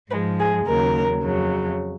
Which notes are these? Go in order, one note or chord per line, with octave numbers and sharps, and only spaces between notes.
G#2 F3 G#3 B4
G#4
D#2 C#3 F#3 A#4
F2 C#3 F#3